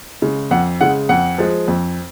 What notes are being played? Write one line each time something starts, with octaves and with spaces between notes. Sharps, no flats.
C#3 G#3
F2 F#5
C#3 G#3 F#5
F2 F#5
F3 G#3
F2